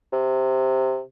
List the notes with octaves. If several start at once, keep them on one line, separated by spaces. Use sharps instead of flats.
C3